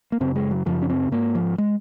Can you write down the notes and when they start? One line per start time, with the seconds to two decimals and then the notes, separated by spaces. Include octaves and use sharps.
0.12 A#3
0.20 F#2 C#3 C4
0.36 G#3
0.51 F#3
0.66 F#2 C#3 F3
0.82 C#4
0.90 C4
1.11 G#2 A#3
1.35 F3
1.58 G#3